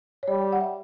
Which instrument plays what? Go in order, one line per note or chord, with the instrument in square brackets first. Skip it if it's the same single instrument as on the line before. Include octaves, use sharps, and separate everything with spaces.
[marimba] C#5
[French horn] G3 [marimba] D5
[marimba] F#5
E5